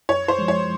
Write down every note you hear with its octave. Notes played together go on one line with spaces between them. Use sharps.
F#2 C#5
C5
F3 G#3
C#5